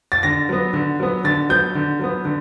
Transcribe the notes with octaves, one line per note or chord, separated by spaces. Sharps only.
A6
D3 A#6
F#3 B3
D3
F#3 B3
D3 A6
F#3 B3 G6
D3
F#3 B3
D3